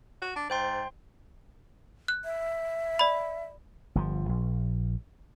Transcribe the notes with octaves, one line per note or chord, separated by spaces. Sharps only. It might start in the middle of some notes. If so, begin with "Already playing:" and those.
F#4
D4
G#2 C5 G5 C6
F#6
E5
D5 B5
G1 C#3 F3
A#1